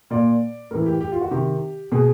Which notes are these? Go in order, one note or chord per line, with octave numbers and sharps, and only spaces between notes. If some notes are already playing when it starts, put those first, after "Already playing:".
A#2 D5
A2 E3 A#4
G4
G4
F4
F#4
C3 D#3 G4
B2 G#4